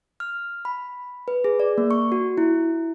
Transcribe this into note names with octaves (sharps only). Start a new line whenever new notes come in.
F6
B5
B4
G#4
D5
A#3
C#6
F#4
E4